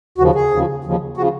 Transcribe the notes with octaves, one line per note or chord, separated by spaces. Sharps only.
D#2 C#3 F3 F#4
G#4
D#2 C#3 F3
D#2 C#3 F3
C#3 F3 F#4